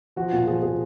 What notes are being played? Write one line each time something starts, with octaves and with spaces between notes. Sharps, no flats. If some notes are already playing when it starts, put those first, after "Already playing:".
F3 F#4
A#2 F4
F3 G#4
A#2 G#4